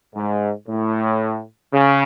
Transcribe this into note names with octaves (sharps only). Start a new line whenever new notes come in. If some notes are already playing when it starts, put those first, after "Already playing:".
G#2
A2
C#3